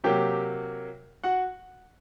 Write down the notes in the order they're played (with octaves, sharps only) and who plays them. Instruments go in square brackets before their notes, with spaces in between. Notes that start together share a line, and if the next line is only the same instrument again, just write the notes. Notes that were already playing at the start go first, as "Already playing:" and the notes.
[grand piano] C3 F#3 A#3 G4 G5
F#4 F#5